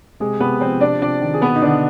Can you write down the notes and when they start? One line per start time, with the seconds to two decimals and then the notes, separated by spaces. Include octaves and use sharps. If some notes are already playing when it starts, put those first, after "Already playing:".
0.20 C3 G#3 G#4
0.40 C3 B3 B4
0.60 F3 C4 C5
0.81 C3 D4 D5
1.02 C3 D4 D5
1.21 D#3
1.34 G#4
1.41 B2 B3 B4
1.56 D#4
1.62 B2 D3 D4